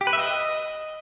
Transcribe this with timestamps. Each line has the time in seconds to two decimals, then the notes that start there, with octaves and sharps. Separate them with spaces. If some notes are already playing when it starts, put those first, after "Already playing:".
0.01 G4
0.07 B4
0.13 E5
0.19 D#5